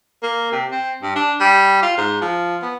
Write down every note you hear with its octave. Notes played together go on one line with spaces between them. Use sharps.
A#3
C3
C4
G2
D4
G3
F4
G#2
F3
B3